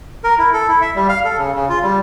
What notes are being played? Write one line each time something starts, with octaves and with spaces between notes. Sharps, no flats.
A#4
E4
A4
E4
E5
G3
F5
A4
C#3
C#3
F4
G3